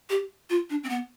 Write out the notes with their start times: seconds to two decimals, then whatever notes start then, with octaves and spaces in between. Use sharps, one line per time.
0.10 G4
0.50 F4
0.70 D4
0.83 C4
0.89 B3